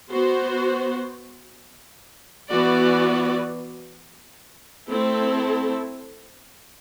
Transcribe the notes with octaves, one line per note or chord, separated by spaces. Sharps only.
B3 F#4 C5
E3 B3 F#4 B4 D5
A3 C4 E4 A4